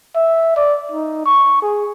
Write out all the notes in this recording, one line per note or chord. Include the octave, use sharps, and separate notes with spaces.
E5
D5
D#4
C#6
G#4